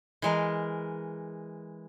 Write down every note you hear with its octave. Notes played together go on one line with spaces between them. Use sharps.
E3 G#3 A#4